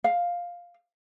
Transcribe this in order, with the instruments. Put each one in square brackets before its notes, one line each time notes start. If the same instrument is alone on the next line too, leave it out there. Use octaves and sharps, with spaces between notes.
[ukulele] F5